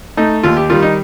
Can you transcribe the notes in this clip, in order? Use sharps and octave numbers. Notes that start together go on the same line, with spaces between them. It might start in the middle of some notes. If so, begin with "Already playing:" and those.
A3 D#4
D#2 F4
G4
D#3 G3 F4
D#4